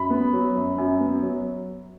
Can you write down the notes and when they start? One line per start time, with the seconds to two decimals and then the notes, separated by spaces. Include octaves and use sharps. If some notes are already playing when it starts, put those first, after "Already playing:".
Already playing: F#2 B5
0.10 B3
0.33 F#3
0.55 F#2
0.78 F#2
1.00 B3
1.23 F#3